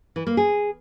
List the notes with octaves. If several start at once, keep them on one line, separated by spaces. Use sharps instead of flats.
E3
A#3
G#4